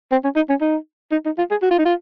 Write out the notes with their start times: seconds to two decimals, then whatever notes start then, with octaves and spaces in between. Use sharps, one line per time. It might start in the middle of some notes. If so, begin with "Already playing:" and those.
0.12 C4
0.24 C#4
0.36 D#4
0.50 C#4
0.61 D#4
1.12 D#4
1.26 D#4
1.38 F4
1.51 G#4
1.62 F#4
1.71 F4
1.79 D#4
1.86 F4